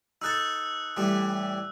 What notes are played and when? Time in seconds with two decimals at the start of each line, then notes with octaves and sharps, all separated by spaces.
0.22 D#4 A4 E6 F#6
0.97 A2 E3 G3